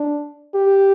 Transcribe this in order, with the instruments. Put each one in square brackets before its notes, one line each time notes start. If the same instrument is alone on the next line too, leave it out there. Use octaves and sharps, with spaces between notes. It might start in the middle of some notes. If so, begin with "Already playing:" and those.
Already playing: [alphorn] D4
G4